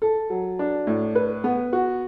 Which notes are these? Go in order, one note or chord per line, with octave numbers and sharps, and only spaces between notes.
A4
F#3
D4
A2
B4
B3
F#4